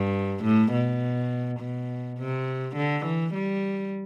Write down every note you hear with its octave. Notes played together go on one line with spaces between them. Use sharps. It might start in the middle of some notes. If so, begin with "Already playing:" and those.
Already playing: G2
A2
B2
B2
C3
D3
E3
G3